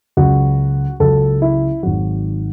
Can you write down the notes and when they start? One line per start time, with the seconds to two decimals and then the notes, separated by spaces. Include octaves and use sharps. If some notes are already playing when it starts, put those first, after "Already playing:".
0.17 C#2 C#3 F#3 F#4
1.00 C#2 C#3 F#3 A4
1.42 E4
1.83 G#1 G#2 D#3 F#3 F#4